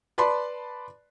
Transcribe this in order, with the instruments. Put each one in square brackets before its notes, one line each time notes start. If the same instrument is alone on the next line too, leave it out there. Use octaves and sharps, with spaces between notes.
[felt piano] B4 D5 A5 B5 C6